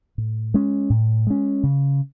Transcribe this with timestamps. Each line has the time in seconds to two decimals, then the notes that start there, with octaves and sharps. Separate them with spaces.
0.18 A2
0.54 G#3 C#4
0.90 A2
1.27 G#3 C#4
1.63 C#3